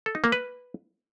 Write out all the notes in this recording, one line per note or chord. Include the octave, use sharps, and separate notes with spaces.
A4
D#4
A#3
B4